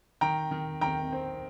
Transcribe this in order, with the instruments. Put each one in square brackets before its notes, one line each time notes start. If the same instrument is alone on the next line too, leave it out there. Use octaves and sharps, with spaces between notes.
[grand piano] D#3 G5 A#5
D#3
D#3 G5 A#5
C4